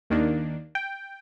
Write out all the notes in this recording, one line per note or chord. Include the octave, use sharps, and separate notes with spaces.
D#2 D#3 A#3 D4
G5